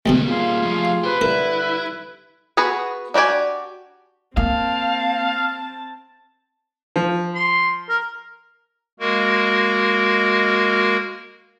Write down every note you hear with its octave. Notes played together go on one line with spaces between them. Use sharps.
D2 G2 B2 G3 A#3
F4 G#4 F5
F3 A3
G4 B4 C5
D3 G3 E4 A#4
B3 F#4 G#4 B4
D4 F#4 G4 D5 G#5
A#3 C4 F5 A5
F3
C6
A#4
G#3 A#3 F#4 A#4